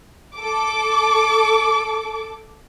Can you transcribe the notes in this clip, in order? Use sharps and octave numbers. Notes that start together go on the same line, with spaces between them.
A4 D6